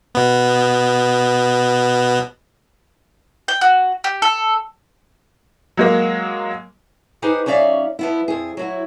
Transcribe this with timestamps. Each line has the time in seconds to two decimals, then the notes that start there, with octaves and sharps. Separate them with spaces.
0.15 B2 B3
3.48 G5
3.61 F#4
4.04 G4
4.22 A4
5.77 F#3 G#3 A#3
7.22 D#4 G4 G#4 B4 C5
7.46 F#3 C#4 D#4 D5 E5 F5
7.99 F3 B3 E4
8.28 F2 G#4
8.57 F#3 E4 F#4